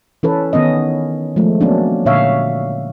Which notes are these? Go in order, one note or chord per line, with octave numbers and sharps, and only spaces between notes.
E3 C#4 A4 B4
D#3 B3 C#4 D#5
F3 G#3 A3
F#3 A#3 B3 C#4 D4
A#2 D3 C#5 E5 F5